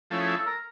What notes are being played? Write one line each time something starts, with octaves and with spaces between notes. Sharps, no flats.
F3 A3 C#4 E4
G#4
A4
A#4